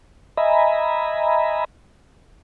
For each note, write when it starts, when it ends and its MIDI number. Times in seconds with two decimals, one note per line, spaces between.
0.37 1.64 75
0.37 1.64 76
0.37 1.64 80
0.37 1.64 82
0.37 1.64 83